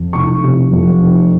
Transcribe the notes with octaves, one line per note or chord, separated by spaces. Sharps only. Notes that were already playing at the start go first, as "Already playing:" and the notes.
Already playing: F2
F1 C#6
C3
F2
F1